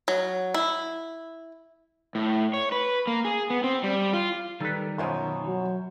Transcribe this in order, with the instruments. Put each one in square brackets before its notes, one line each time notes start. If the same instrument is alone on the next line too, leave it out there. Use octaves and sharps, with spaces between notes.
[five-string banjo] F#3
E4
[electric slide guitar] A2
C#5
B4
A#3
G#4
B3
C4
G3
F4
[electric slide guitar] D#3 [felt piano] G3 [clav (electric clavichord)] A4 B4
[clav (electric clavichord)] F#2 B2 [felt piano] F4 C5 C#5
[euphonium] F#3